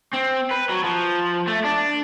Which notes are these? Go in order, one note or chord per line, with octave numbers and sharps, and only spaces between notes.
C4
B4
F#3
F3
A3
D4